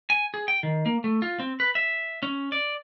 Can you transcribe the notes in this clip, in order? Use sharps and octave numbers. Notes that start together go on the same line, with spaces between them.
G#5
G#4
G5
D#3
A#3
A3
F4
C4
B4
E5
C#4
D5